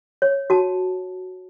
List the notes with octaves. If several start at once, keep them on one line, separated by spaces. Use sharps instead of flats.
C#5
F#4 A5